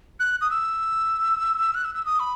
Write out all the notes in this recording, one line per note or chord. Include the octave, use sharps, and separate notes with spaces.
F#6
D#6
E6
F#6
E6
E6
D#6
B5